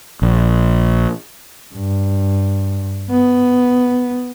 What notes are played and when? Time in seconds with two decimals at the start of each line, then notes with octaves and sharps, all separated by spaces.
0.22 A#1
1.74 G2
3.10 B3